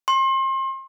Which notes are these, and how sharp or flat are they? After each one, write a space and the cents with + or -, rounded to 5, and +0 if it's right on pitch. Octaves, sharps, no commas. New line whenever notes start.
C6 +35